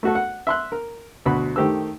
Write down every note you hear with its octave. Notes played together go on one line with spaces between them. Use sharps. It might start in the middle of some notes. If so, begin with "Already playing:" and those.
A3 F#4 A4
F#5
E5 C6 F#6
A#4
D2 B2 F#4 B5
D#3 A3 G4 C5 E6